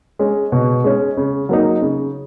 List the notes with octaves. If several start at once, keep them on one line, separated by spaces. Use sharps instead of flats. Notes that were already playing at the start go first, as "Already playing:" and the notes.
G#3 C#4
B2
G#3 C#4
C#3
F#3 A#3 D#4
C#3